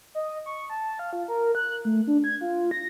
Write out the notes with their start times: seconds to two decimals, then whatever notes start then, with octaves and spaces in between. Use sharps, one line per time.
0.15 D#5
0.46 C#6
0.70 A5
0.99 F5
1.13 F4
1.28 A#4
1.55 F#6
1.85 A3
2.07 D4
2.24 G#6
2.41 F4
2.71 A#6